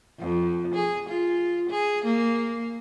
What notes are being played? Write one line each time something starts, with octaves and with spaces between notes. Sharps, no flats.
F2
G#4
F4
G#4
A#3